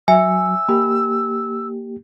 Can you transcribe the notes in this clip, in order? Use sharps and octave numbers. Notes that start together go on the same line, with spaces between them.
F#3 E5 G#5 E6
A#3 G4 B5